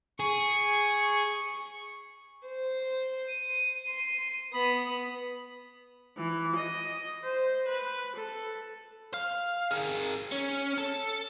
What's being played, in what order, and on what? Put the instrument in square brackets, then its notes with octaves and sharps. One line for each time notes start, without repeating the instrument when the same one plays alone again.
[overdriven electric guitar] G#4 [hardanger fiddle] C#6
[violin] C5
[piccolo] D#7
[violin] C6
[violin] B3 D#6 [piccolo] B5
[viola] E3
D#5
C5
B4
A4
[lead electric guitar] F5
G#4 A#4
C#4
A4